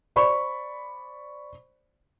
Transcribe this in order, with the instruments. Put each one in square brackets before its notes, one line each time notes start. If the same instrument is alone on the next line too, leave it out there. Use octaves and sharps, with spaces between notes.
[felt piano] C5 D5 B5 C#6